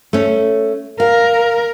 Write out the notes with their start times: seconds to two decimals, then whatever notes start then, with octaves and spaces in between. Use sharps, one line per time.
0.13 A3 C#4
1.00 A#4 F5